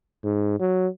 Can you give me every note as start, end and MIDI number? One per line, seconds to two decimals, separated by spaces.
0.24 0.58 44
0.60 0.87 54